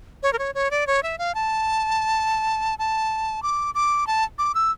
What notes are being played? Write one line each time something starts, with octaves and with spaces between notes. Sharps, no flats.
C#5
A#4
C#5
C#5
D5
C#5
E5
F5
A5
A5
D6
D6
A5
D6
E6